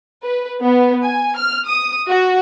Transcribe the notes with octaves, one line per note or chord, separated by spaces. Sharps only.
B4
B3
G#5
F6
D#6
F#4